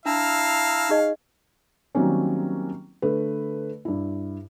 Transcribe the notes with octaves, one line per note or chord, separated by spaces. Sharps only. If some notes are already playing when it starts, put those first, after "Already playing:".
D4 E4 F5 A5 A#5 E6
D#4 G#4 D#5
D#3 F#3 G3 A#3 C4 C#4
D3 A3 A4 B4
G2 E4